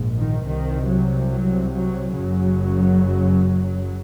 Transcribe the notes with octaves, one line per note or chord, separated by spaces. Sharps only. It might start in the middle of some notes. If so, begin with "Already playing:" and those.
Already playing: A#1 G#2
D#3
C2 C3 D#3
F#3
F#3
F#3
F#1 F#2 C#3 F#3